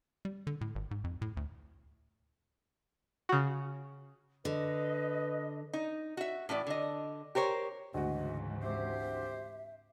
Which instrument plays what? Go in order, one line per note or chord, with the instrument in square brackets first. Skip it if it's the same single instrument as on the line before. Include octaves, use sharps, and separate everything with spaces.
[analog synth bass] G3
D3
A2
G#1
G#2
F2
A2
D2
[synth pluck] C#3 F#4
[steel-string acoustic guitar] D3 [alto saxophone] B4 [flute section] D#5
[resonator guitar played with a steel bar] D#4
F#4 E5
A2 E3 D#4 D5
D3 D#5
G4 A#4 C5 C#5
[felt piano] D2 F#4 [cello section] G#2 C#3 E3 [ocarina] D#5
[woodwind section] C4 G4 C5 [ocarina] E5